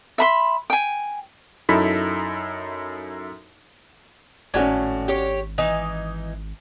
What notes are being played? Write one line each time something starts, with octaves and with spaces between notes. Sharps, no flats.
E5 B5 C6
G5 G#5
F#2 D#4 E4 A4 B5 B6
G#1 A2 C#4 F#4 D5
G4 C#5
E3 D#4 D#5